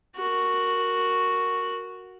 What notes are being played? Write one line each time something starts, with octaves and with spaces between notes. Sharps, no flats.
F#4 A#4